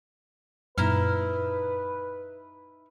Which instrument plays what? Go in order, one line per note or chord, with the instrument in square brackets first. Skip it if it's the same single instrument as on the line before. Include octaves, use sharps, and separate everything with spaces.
[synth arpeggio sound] F#2 A#2 [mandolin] D#4 E4 F6 [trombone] B4